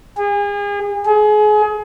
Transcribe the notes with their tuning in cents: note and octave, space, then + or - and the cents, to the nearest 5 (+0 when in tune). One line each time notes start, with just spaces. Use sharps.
G#4 -35
G#4 +30